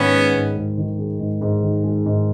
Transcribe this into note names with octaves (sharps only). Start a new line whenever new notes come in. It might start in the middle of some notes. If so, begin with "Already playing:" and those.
Already playing: G#2 D#3 B3 C#4
G#3
G#2
G#2
D#3
G#3
G#2
G#2
D#3
G#3
G#2